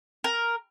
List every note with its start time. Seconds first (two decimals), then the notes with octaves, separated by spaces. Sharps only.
0.24 A#4